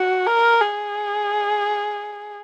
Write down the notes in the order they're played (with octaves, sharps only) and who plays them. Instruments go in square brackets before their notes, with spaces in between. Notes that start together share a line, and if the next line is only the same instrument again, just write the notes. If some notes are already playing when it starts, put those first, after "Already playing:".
Already playing: [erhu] F#4
A#4
G#4